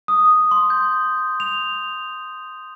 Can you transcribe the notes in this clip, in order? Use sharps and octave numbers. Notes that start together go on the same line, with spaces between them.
D#6
C6
G6
F7